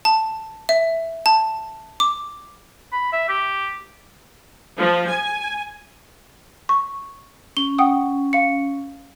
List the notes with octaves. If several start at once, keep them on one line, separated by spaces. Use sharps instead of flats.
A5
E5
A5
D6
B5
E5
G4
F3
G#5
C#6
C#4 G7
F#5 G5 D#6
F5 C#7